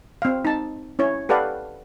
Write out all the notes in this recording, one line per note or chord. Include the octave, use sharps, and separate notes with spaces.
C4 F5
D#4 A5
C#4 E4 C#5
G4 A4 B4 D5 F5 F#5